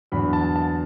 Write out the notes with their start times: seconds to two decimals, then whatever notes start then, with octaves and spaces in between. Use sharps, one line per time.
0.12 E2 D3 F#3 B5
0.33 A5
0.56 A5